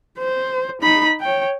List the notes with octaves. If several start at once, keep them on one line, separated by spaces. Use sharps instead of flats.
C5
D#4 B5
C#5 G5